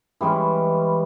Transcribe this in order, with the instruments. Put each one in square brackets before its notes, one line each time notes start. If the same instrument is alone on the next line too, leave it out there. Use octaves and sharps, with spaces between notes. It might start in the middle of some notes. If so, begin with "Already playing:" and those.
[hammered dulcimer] E3 G3 G#3 C#4